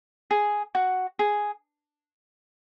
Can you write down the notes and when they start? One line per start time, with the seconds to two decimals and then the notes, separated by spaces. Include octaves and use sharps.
0.31 G#4
0.75 F#4
1.19 G#4